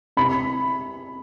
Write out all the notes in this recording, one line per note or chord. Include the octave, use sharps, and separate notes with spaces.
C3 B5